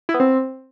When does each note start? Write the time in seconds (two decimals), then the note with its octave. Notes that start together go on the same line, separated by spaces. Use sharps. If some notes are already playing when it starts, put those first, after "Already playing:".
0.09 E4
0.14 B3
0.20 C4